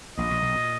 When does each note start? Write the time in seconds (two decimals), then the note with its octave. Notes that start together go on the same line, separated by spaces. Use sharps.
0.18 A#1 A#2 D#5
0.30 A#1 A#2
0.43 B1 B2
0.55 A#2